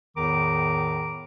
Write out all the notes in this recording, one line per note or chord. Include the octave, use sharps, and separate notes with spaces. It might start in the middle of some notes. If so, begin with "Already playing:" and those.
E2 A2 D#3 A#5 D6